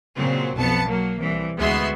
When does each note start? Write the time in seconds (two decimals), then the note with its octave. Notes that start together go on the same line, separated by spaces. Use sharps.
0.16 A#2 C#3 F#3 C4
0.56 B1 F2 B3 A5 C#7
0.87 F#3 A#3
1.19 C2 E3
1.58 D2 G#3 B3 F#4 E5 C6